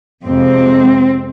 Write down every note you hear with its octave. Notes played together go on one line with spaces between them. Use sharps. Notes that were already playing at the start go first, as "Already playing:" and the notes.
F2 C3 G#3 C4